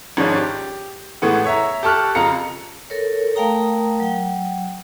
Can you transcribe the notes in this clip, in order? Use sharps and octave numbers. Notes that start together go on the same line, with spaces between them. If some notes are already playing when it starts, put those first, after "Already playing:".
G#1 G#2 F3 C#4 D4
G4
A2 E3 G#3 B3
C#5 E5 A#5
G4 A4 A5 C#6 F6 F#6
F2 C#3 F4 A#5 C#7
A4 A#4 C#5
A3 A#4 F5 G5 A#5 D#6
F#3 G5